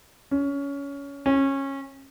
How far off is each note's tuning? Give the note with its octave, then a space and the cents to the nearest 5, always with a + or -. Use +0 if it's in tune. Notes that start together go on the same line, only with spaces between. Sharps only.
C#4 +20
C#4 -20